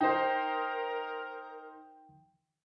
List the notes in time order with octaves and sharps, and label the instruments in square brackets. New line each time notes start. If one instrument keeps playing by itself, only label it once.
[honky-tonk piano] D#4 C5 [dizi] A#4 [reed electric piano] G5